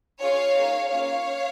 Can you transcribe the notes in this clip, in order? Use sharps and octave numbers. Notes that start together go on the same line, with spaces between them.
C#4 F4 G#4 C#5 F5
A#3 D#4 G#4
A#3 C#4 F4 C#5 F5